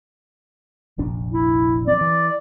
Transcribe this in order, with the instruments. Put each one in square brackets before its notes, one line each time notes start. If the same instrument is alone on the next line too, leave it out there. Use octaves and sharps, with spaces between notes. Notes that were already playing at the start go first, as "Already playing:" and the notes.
[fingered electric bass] F1 A#1 D4
[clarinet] E4
[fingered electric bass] F3 C4 [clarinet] D5
[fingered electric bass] E3